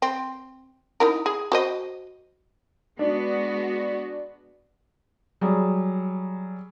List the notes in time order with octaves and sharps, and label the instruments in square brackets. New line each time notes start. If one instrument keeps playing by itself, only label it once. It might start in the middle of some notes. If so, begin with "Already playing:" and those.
[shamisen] C4
D#4 E4 A#4
G#4
F#4 C5 D#5
[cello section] G#3 B3 F#4 [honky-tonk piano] D4
[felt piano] F#3 G3 G#4